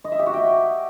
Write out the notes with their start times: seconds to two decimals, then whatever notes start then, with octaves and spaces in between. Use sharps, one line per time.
0.04 D#5
0.12 E5
0.19 G4
0.26 F#4
0.34 G5